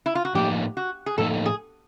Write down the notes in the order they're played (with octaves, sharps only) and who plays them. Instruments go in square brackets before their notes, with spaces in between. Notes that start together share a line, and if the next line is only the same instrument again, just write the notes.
[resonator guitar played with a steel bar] E4
F4
F#4
[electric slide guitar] A2 F3 A#3 D#4 [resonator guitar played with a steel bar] G4
[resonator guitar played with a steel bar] F#4
G#4
[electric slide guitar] A2 F3 A#3 D#4 [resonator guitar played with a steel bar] A4
[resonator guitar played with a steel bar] G#4